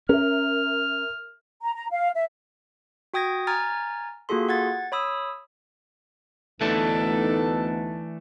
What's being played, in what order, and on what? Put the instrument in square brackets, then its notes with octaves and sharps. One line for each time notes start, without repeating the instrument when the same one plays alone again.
[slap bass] C#4 [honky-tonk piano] A#4 E5 [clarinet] F6
[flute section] A#5
A#5
F5
E5
[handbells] F#4 G5 D#6 G#6 A#6
G#5 A#5 F6 G#6 A6
A#3 F4 F#4 G#4 A4 C6
F#5 G#6 A6
C#5 B5 D#6 E6
[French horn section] D2 B3 D#4 [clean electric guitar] E3 A3 D4 [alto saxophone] A4